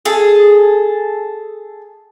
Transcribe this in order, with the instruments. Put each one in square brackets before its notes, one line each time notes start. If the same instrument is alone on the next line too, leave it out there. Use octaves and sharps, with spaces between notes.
[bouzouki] G#4 A4